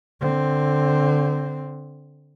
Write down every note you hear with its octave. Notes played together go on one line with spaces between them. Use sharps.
D3 C4